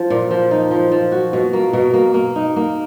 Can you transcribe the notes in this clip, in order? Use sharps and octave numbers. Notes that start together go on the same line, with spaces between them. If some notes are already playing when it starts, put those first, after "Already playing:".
Already playing: F3
A#2
F3
D#4
F3
F3
F#4
B2
A#3
B2
A#3
A#3
D#4
A#3